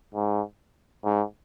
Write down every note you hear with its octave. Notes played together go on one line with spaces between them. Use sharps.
G#2
G#2